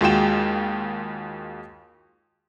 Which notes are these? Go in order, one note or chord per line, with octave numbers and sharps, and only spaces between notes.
D#2 G#3 F4 F#4 G5 E7